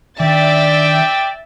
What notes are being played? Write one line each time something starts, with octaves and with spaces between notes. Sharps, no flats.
D#3 D4 D5 E5 G5 A6